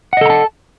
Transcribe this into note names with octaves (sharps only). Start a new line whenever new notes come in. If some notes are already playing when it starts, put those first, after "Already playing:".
A4 D#5 F#5 A5 A#5